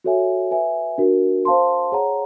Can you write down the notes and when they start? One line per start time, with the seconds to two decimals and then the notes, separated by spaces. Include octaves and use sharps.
0.04 F#4 A4 C#5 E5 G#5
0.51 B4 E5 G#5
0.98 D4 F#4 A#4
1.45 C5 F5 A5 C6
1.92 G#4 C#5 F#5 A#5